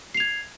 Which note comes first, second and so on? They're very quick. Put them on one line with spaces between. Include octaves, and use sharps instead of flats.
C7 F7 G#6